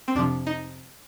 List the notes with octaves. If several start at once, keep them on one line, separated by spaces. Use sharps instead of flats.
C4
F2 C3 F3 D4
D#4